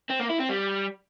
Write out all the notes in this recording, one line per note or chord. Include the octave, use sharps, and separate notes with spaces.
C4
A#3
E4
C4
G3